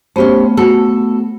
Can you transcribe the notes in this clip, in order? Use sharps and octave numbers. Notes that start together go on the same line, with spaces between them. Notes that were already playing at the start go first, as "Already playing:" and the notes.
A3 B3 C#4 G4 C5
F#4 A4